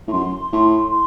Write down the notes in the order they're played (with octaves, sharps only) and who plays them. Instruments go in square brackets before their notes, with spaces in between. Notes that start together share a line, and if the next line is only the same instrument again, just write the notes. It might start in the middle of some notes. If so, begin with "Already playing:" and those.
[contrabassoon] A2
[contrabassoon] F#2 [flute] C6
[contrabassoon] A2
[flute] C6